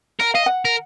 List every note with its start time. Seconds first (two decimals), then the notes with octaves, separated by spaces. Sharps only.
0.20 A#4 F#5
0.34 D#5 F5
0.46 F#5
0.65 A#4